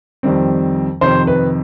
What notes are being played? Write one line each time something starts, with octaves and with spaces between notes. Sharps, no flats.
F2 D#3 G3 C4
F2 C3 D#3 C5
B4